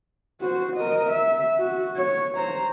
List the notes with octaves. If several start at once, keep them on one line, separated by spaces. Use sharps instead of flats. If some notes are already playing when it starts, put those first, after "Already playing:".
F#4 C5
A#4 D#5
E5
F#4
C#5
C5 A#5